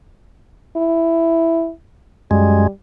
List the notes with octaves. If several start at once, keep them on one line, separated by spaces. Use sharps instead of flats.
E4
F#2 G3 G#3